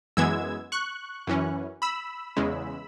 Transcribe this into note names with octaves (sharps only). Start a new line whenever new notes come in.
F#2 E3 G#3 B3 E6 G#6
C#6 F#6
F#2 E3 C#4
B5 E6
E2 C#3 G#3